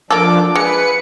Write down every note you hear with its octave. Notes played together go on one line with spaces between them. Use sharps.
F3 A#3 D4 A4 D6
G#3 B4 C#7